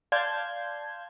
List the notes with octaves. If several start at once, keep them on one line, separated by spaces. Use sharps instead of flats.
D5 F5 A5 C6 G6 G#6